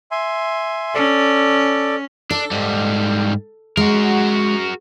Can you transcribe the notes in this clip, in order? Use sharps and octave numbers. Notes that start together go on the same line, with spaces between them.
E5 G#5 C6
C#4 A4 D5
D4 A4
G#2 G3
G#3 F#4 A#4